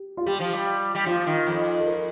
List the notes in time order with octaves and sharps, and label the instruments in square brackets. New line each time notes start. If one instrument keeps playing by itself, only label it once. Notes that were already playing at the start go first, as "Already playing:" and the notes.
Already playing: [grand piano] G4
F4
[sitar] G3 [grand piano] G4
[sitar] F3
G3
G3
[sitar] F3 [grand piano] F4
[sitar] D#3
F2
[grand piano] A4
A#4